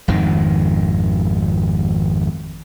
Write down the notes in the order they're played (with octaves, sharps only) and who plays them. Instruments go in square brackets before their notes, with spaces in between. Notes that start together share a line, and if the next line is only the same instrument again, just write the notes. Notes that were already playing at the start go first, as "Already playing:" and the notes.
[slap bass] G#1 F2 D#3